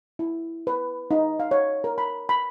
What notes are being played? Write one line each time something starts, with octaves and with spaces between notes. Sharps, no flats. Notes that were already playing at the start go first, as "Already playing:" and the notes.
E4
B4
D#4
F5
C#5
A#4
B5
B5